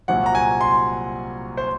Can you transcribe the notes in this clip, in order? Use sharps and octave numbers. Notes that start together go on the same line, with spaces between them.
C2 A#2 F#3 C4 F#5
A#5
G#5
C6
C5